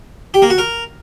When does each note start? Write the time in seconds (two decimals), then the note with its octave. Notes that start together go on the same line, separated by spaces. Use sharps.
0.34 G4
0.42 A#3
0.50 F#4
0.58 A#4